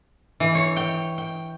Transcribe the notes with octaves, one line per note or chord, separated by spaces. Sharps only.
E3
C#5
G5
G5